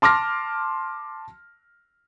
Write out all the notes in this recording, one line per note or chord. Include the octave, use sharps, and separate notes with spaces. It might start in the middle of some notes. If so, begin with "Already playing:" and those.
A5 C6 D6 F6 A#6